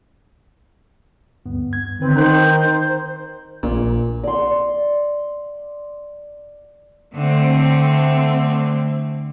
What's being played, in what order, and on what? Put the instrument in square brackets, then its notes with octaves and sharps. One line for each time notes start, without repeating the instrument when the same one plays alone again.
[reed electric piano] D2 G2 B3
G#6
[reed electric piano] D3 D#3 B4 [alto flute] C4
[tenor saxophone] D#3 [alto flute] C5 [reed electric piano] A#5 C6
[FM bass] A#1 [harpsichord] A#2
[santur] D5 C6
[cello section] D3 A3 C4